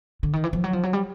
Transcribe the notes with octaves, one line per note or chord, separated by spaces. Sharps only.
D3
D#3
E3
F3
F#3
F3
F#3
G3